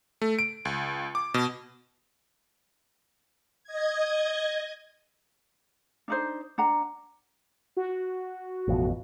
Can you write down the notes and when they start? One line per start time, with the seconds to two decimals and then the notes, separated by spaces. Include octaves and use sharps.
0.22 A3
0.39 D7
0.65 C#2
1.15 D6
1.34 B2
3.64 D#5 G#6
6.08 D4 D#4 C5
6.58 D4 F#5 A#5
7.77 F#4
8.68 A1 F2 B2